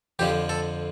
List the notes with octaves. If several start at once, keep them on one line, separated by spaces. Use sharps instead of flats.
F2 D3 F3 G4
A4